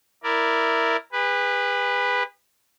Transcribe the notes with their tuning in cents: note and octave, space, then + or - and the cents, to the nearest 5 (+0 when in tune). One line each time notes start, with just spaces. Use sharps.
E4 +0 A#4 -5 D5 +0
G#4 -45 B4 +0